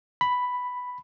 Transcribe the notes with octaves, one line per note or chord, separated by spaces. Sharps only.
B5